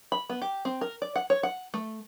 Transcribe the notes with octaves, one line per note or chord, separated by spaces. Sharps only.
B5
B3
G4
C4
A#4
D5
F#5
C#5
F#5
A3